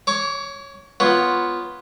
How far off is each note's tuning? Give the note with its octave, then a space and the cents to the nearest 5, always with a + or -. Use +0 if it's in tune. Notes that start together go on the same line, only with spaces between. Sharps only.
C#5 +0 D6 -40
B3 +0 F4 +0 C#5 +0